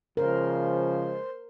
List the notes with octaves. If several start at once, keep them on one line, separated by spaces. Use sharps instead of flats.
C#3 F3 G#3 A#4 C5